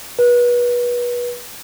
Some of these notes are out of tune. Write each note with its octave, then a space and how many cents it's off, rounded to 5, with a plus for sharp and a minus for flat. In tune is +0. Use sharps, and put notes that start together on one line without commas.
B4 -30